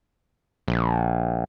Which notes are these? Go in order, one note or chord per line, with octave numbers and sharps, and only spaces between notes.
A#1